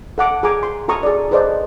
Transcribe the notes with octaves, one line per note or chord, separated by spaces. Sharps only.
A4 F#5 D6
G#4 G#5 A#5 D6
C6
F#4 A4 A#5 C#6 D#6
G#4 D5
G#4 A4 B4 C5 D5 D#5